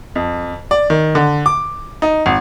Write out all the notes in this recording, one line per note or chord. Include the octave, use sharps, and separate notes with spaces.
F2
D5
D#3
D3
D6
D#4
G#1